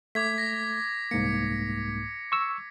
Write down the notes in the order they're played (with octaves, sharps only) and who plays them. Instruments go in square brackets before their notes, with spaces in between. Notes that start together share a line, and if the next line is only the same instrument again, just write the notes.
[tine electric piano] A3 [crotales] D6 G#6 B6
[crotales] A#6
[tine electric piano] C2 G#2 A#3 [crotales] C#7
[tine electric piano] C#6 E6